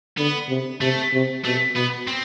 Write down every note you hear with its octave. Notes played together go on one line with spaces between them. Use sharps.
D3 B3
C3
C3 A3
C3
B2 A3
B2 B3
C4